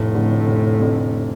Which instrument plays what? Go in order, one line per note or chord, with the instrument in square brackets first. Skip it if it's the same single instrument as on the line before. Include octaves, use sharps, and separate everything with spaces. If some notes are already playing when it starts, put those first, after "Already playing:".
Already playing: [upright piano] F1 [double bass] A2
[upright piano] F2 D3
F1
F2 D3